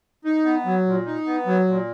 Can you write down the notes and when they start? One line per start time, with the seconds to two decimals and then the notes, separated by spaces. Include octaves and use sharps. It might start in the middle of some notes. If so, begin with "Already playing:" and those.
0.25 D#4
0.45 B3
0.65 F#3
0.85 A#2
1.06 D#4
1.26 B3
1.46 F#3
1.66 A#2